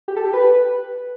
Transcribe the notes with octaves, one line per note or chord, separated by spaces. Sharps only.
G4
A4
G4
B4